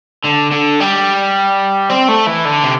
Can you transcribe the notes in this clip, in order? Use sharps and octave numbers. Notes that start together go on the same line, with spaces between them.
D3
D3
G3
C4
A3
E3
D3
C3